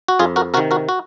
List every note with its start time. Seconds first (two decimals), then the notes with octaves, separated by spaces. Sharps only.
0.08 F#4
0.19 F2 F4 G#4
0.36 F#4 A#4
0.54 C3 F#4 A#4
0.57 D#3
0.71 F#4 A#4
0.89 F#4